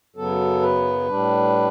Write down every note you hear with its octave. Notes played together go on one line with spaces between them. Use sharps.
F#2 C#3 F#3 B3 A4
B4
A2 G3 D4